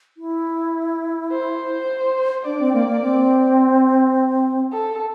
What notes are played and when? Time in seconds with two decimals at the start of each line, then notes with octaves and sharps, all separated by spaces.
0.17 E4
1.31 C5
2.45 D4 D5
2.60 C4
2.73 A#3
2.87 A#3
3.02 C4
4.72 A4